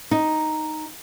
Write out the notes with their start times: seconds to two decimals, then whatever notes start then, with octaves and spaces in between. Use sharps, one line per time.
0.11 D#4